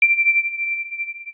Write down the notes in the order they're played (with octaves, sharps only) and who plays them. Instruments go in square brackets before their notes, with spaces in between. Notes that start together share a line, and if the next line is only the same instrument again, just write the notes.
[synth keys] D7